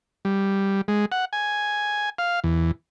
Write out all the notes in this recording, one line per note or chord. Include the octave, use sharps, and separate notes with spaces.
G3
G#3
F#5
G#5
F5
E2